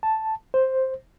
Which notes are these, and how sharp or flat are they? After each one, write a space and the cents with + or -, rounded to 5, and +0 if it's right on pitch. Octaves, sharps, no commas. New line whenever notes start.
A5 +0
C5 +5